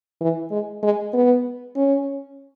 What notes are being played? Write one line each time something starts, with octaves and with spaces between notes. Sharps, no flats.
E3
G#3
G#3
B3
C#4